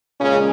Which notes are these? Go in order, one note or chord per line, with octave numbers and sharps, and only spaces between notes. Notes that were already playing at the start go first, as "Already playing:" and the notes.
A#2 C#3 G#3 C#4